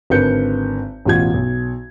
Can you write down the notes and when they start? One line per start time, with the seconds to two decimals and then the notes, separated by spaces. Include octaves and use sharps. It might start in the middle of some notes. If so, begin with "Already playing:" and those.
0.10 G#1 D3 A#4 B4 G6 C#7
1.05 A1 E2 B2 F4 F#4 G#6
1.34 B1